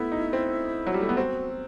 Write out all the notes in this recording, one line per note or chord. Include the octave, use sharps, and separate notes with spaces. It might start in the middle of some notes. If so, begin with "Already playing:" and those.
Already playing: A3 B3 E4
D#4
C4
F#3
G3
A3
B3
C4 F#4